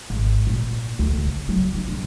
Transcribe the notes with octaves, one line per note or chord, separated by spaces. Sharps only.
G#1
A#2
D2
C#3
F#3
D4
B1